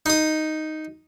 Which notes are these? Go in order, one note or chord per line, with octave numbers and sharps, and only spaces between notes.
D#4 D#6